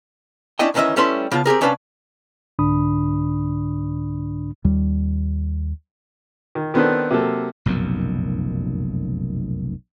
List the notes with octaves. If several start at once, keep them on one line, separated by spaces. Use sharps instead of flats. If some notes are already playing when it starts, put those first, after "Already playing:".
C#4 D4 E4 D#5 G5
D2 D#3 E3 C#4 D#5 E5
G3 A3 C#4 E4 B4 C6
C#3 B3 F4 A5
C4 G4 G#4 A#4
C2 C#4 D4 B4 F5 A5
C2 G#2 D3 D4 B5 D#6
D#2 G3
D#3
D#3 B3 C4 D4 A4 B4
C3 F#3 A#3 A4
F1 B1 F#2 A#2